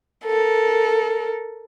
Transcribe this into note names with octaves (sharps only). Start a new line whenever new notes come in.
A4 A#4